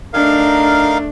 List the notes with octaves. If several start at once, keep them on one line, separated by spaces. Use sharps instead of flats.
A3 D4 D#4 A#4 F5